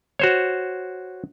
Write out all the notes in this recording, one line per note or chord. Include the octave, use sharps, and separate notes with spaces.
F#4 C5 C#5